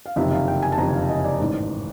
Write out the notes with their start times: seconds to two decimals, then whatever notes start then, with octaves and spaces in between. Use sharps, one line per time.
0.06 F5
0.16 F#1 F2 C3 D#3 E5
0.31 F5
0.48 G5
0.63 G#5
0.72 A5
0.78 F#1 F2 C3 D#3 A#5
0.93 F5
1.09 D#5
1.25 D5
1.39 A1 G#2 D#3